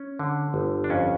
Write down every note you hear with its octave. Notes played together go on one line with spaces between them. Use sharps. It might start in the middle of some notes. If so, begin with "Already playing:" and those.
Already playing: C#4
D3
G1
D4
F2 C#4